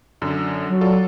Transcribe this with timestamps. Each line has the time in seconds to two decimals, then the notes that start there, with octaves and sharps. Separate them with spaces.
0.22 F#2 D3
0.69 F#3
0.81 F4 A4 D5